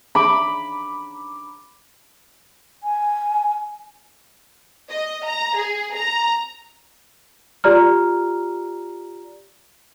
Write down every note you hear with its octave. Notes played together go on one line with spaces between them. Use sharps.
B5 D6
G#5
D#5
A#5
G#4
A#5
F4 G4 D5 A#5 F6